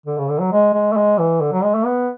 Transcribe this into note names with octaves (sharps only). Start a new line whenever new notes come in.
D3
C#3
D3
F#3
G#3
G#3
A3
G#3
E3
D3
F#3
G#3
A3
B3